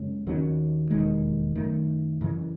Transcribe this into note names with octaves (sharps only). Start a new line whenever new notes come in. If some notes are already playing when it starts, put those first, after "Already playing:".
Already playing: F#2 C#3 G#3 C#4
D#2 D#3 F#3 C#4
E1 D#2 D#3 G#3
F#2 D#3 A3
F#2 C#3 E3